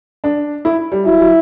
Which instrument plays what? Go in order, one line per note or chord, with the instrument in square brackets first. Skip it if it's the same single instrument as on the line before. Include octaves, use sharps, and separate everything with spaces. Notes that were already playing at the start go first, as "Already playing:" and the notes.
[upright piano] D4
E4
G3
[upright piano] F#3 [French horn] E4
[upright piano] F#3